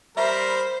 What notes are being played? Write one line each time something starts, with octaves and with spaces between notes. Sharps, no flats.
G3 A#4 C5 E5 B5 C#6